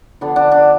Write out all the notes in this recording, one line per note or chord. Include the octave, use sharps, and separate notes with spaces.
D3 F3 B3 D4
D4
D4